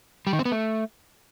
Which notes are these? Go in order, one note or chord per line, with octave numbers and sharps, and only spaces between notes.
G3
D#3
C4
B3
A3